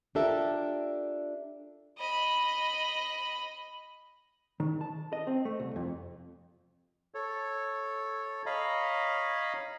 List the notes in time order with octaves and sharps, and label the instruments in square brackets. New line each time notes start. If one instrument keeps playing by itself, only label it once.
[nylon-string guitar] D4 F4 G4 A4 A#4 E5
[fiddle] D#5 B5
[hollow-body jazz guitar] D#3
A5
D#5
C4
A3
C2
F2
[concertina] A4 C#5
C#5 D#5 F5 A#5 B5